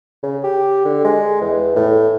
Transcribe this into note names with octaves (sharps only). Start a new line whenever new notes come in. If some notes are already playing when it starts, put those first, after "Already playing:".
C#3
G4
D3
G#3
E2
A2